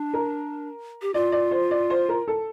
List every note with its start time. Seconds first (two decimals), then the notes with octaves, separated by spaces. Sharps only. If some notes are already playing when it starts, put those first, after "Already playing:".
Already playing: D4
0.14 A#4
1.02 G4
1.14 F4 D5
1.32 D5
1.51 C5
1.71 D5
1.90 C5
2.09 A#4
2.28 A4